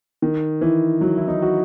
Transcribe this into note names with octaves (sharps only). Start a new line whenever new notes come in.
D#3
E3
F#3
E4
D#4
F#4